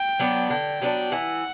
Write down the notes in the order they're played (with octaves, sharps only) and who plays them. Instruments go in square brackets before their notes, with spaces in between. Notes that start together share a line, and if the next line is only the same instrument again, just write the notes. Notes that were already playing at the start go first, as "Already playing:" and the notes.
Already playing: [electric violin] G5
[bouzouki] F#3 B3 D4
[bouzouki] D3 [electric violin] G5
[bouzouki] F#3 B3 D4
[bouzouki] E3 [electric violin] F#5